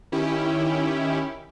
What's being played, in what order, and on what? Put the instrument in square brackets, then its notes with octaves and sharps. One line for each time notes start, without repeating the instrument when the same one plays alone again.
[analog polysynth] D#3 C#4 E4 G4